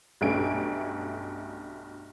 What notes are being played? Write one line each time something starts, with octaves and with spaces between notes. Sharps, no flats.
B1 G2 A3 C#4 D7